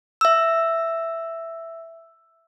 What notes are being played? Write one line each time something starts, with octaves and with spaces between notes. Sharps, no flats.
E5 E6